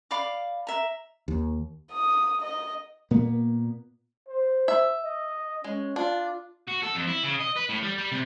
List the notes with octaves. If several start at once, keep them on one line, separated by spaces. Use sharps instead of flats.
D5 F5 B5 D6
E5 A#5
D#2
D#6
D#5
A#2 A#3 B3
C5
E5
D#5
G#3 C#4
D4 F4
F#4
A4
F2
E4
C#3
D#5
B4
A2
G3
G3
C3